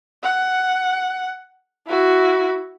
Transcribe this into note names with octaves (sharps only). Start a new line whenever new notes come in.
F#5
E4 F#4